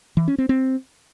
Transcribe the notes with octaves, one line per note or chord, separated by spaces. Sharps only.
E3
C#4
C4
C4